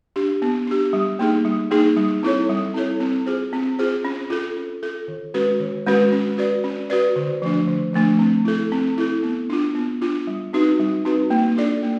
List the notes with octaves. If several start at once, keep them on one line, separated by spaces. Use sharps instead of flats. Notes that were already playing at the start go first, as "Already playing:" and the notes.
D4 G4
B3
D4 G4
G3
A#3 D#4 G#4
G3
A#3 D#4 G#4
G3
C4 E4 A4 C#5
G3
C4 E4 A4 C#5
C4
F4 G#4 C5
C4
F4 G#4 C5
C#4
F4 A4
C#4
F4 A4
D#3
G#3 C#4 F#4 B4
D#3
G#3 C#4 F#4 B4
C#4
F#4 B4 D5
C#4
F#4 B4 D5
D3
F3 A3 D4
D3
F3 A3 D4
C4
E4 A4
C4
E4 A4
B3
D4 F4
B3
D4 F4
G3
C4 D#4 F#4 B4
G3
C4 D#4 F#4 B4
A#3
D4 F4 A4 D5
A#3